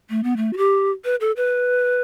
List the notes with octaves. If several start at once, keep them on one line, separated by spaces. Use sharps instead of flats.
A3
B3
A3
F#4
G4
B4
A4
B4